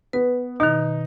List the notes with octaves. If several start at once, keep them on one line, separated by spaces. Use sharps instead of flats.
B3 B4
B2 D#3 D#4